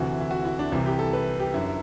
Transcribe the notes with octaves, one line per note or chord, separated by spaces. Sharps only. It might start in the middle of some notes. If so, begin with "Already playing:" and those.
Already playing: D2 C3 E3 F#4
E4
F#4
E4
D4
C2 C3 E3 E4
G4
A4
B4
G4
F#2 D3 E4